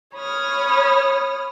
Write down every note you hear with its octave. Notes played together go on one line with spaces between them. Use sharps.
C#5 B5 D#6 F6